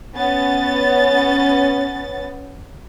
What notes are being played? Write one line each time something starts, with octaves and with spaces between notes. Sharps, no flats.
B3 C#4 A6